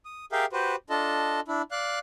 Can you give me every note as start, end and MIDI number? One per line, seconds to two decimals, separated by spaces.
0.05 0.25 87
0.32 0.46 67
0.32 0.46 68
0.32 0.46 70
0.32 0.46 76
0.32 0.46 77
0.32 0.46 79
0.52 0.76 66
0.52 0.76 67
0.52 0.76 71
0.52 0.76 72
0.90 1.40 62
0.90 1.40 65
0.90 1.40 69
0.90 1.40 75
0.90 1.40 81
1.48 1.62 62
1.48 1.62 64
1.71 1.99 74
1.71 1.99 77
1.71 1.99 90